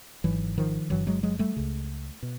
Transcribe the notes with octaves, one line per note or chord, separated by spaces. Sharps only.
G#1 G#2 E3 F#3
D#3 F3
G1 G2 D3 E3 F#3
F#3 G#3
F#3 G#3
G3 A3
C#2 C#3
B2